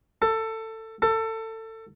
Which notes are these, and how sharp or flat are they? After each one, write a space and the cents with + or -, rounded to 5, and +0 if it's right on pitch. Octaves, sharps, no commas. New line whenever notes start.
A4 +20
A4 +25